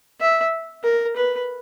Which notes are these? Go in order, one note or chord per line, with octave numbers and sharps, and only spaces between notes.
E5
A#4
B4